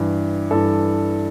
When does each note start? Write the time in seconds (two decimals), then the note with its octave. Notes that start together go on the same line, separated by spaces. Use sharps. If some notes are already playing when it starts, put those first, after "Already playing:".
Already playing: G2 E3
0.51 G2 E3 A4